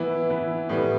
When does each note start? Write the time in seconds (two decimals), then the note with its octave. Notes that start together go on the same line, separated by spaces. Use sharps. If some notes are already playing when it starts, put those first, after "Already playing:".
Already playing: E3 B3 E4
0.30 E3 B3 E4
0.69 A2 G3 B3